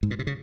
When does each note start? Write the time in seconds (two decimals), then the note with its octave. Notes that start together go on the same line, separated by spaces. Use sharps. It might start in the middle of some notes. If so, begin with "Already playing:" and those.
0.03 G#2
0.11 A#2
0.19 C3
0.27 C#3